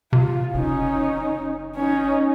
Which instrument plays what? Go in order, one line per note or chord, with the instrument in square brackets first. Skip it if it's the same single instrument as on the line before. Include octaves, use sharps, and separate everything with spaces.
[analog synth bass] C3 [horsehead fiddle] F4
[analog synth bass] F#1 [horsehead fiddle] C#4 D#4
[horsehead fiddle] C#4 D#4